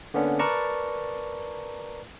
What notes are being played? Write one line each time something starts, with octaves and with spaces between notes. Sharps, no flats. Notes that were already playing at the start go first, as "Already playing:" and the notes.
D3 A#3 B3 C#4 D4
A#4 B4 D5 A5 A#5 C#6